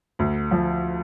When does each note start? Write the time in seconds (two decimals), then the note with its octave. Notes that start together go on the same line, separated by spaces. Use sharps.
0.19 D2
0.51 F3